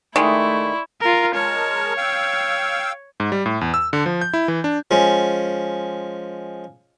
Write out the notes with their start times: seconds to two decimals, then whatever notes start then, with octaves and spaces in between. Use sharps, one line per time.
0.16 D#3 G#3 A3 E4 D5 C6 C#6
1.01 F4 A#4
1.35 G#3 A#4 C#5 A5
1.97 F5 G5 E6
3.20 G#2
3.32 G3
3.46 A2
3.61 E2
3.74 E6
3.93 D3
4.06 F3
4.21 G6
4.33 E4
4.48 E3
4.64 D4
4.91 F3 G#3 C#4